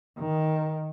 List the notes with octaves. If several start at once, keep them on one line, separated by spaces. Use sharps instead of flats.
D#3